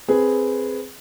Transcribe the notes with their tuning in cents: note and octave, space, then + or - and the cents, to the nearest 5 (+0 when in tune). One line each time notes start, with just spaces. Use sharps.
C4 +0 G#4 +0 B4 +0